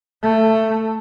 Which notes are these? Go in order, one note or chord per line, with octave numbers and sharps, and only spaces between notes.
A3